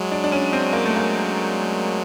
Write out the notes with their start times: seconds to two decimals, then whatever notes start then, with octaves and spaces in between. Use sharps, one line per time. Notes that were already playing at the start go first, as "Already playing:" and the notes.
Already playing: F#3 G#3
0.12 D4
0.24 D4
0.32 C#4
0.53 C4
0.73 A#3
0.86 A3
0.96 A#3